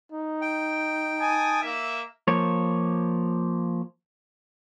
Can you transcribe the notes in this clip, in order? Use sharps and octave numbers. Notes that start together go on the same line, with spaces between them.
D#4
G5
G#5 A5 D#6
A#3 E5
F3 A#3 C#5